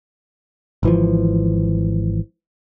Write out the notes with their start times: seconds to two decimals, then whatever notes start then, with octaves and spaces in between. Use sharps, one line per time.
0.83 G#1 E3 F3